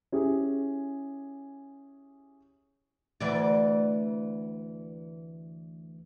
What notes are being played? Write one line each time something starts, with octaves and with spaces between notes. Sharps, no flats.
C#4 E4 G4 G#4
D2 E3 D5